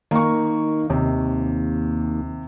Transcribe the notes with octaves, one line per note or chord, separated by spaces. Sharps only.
D#3 A#3 C#6
D#2 C3